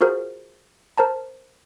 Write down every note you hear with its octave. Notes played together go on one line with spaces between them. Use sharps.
F4 F#4 G#4 A#4 C5
A#4 C5 A5 A#5